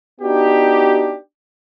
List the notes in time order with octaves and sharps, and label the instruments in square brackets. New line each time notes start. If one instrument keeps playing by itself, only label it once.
[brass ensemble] B3 D4 D#4 F#4 G4